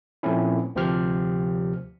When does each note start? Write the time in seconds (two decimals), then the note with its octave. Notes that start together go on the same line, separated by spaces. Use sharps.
0.23 A#2 F3 A3 C4 C#4 E4
0.75 D2 C3 F3 G4 C5 F6